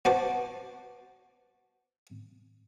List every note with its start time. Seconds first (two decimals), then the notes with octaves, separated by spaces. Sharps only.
0.05 B3 F#4 C5 A5 C#6 D6